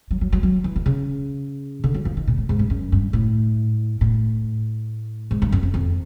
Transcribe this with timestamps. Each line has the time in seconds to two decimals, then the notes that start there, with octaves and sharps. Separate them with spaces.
0.11 F#3
0.21 F#3
0.33 F#3
0.43 F#3
0.64 E3
0.76 D3
0.86 C#3
1.84 D3
1.94 F#3
2.05 F3
2.17 D#3
2.27 A#2
2.37 A2
2.49 G#2
2.59 G2
2.70 F#2
2.92 G2
3.13 A2
4.01 A2
5.31 G#2
5.42 G2
5.52 F#2
5.63 F2
5.74 F2